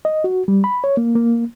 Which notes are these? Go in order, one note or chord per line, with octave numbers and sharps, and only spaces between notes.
D#5
F#4
G3
B5
C#5
A#3
A#3